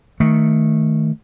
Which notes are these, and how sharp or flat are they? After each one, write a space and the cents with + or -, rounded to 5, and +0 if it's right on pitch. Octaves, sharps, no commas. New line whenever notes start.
D#3 +10 A3 +0